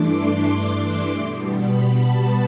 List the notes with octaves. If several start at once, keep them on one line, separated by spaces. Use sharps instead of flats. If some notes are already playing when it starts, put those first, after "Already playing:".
Already playing: G2 E3 A3 D4 C6 D6
C6
B2 G3 B3
B5
A5